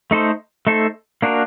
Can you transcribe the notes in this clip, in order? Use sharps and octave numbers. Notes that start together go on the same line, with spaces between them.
A3 D#4 A4 C5
A3 D#4 A4 C5
A#3 D4 F#4 A#4